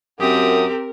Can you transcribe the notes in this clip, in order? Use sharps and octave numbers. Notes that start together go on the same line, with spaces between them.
F#2 C4 G4 A#4 D#6